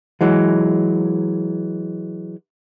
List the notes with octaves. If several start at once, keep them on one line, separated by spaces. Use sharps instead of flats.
E3 F#3 G#3